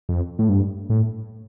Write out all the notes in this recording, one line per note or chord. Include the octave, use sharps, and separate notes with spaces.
F2
A2
G2
A2